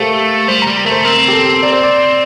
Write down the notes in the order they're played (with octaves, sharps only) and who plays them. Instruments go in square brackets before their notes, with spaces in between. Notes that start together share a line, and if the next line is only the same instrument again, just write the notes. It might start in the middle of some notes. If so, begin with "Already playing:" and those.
Already playing: [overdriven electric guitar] A3 [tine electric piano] G4 A4 A#4 C5 F5
[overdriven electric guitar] G3 [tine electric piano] C5
[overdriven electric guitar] G3 [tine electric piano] A#5
[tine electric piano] A#5
[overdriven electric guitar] A3 [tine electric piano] A#4
[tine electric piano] C5
[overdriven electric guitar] C4 [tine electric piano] A#4
[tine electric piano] G4
A4
D5
C5
D5